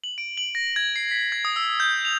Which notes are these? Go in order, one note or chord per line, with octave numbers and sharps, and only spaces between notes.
F#7
D7
F#7
A#6
G#6
C7
B6
G#6
D#6
E6
G6
F7